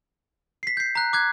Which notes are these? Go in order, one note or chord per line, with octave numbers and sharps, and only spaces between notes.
B6 C7
G6 C7
A#5 F#6
D6 F#6 G#6